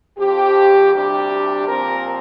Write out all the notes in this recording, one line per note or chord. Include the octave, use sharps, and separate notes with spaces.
F2 F3 C4 G4
D2 C3 G3 D4 G4
A#2 F3 C4 A#4